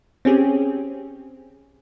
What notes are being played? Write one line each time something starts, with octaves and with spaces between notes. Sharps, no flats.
C4 C#4 G4 G#4